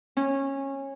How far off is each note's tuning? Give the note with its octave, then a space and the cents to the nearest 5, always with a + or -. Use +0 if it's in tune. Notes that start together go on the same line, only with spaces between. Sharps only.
C#4 -20